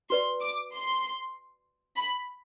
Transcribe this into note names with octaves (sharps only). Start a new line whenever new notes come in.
F#4 B4 D5 C6
D6
C6
B5